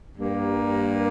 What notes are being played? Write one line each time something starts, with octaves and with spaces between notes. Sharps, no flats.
G2 G3 A#3